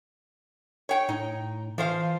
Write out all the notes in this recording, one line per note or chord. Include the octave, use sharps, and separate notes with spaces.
C#5 G5
A2 D#4
E3 F3 C5 F5